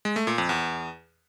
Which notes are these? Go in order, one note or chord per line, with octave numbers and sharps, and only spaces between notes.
G#3
A3
A#2
F2
E2